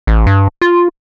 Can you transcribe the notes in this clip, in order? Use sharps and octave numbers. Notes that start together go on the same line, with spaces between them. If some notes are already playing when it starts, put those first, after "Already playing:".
A1
G2
F4